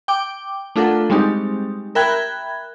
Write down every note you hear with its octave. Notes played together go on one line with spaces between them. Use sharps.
G5 D6
A3 D4 F4 A4 A#4 F#5
G3 G#3 C4 D#4 G4
A#4 E5 G5 B5 F#6 G#6